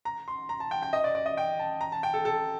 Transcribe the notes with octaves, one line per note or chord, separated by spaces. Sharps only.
A#5
C6
A#5
A5
G5
G5
D#5
D5
D5
D#5
G5
A5
A#5
A5
G5
A4
A4